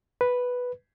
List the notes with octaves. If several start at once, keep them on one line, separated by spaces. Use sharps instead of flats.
B4